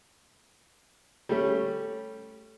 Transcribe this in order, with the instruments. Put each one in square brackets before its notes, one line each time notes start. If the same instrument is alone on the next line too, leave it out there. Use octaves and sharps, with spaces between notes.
[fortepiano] G3 A3 C#4